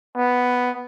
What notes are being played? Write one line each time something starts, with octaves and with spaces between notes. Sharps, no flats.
B3